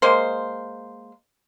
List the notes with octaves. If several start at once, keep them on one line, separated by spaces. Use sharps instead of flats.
G#3 A#3 C5